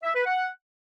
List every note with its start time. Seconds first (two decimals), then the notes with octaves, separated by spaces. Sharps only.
0.03 E5
0.14 B4
0.25 F#5